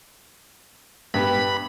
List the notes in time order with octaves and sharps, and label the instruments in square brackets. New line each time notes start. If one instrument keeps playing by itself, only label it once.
[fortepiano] G2 B3 [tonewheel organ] B5